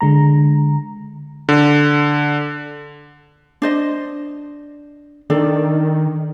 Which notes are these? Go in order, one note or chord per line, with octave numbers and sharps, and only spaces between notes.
D3 G#3 A#5
D3
D4 C5 D#5
D#3 D4 A4 D5